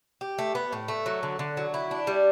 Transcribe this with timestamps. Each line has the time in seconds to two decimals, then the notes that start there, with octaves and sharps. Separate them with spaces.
0.21 G4
0.39 A3
0.55 B3
0.73 A2
0.88 A3
1.06 F#3
1.23 D3
1.39 D3
1.57 F#3
1.74 E4
1.91 D4
2.07 G3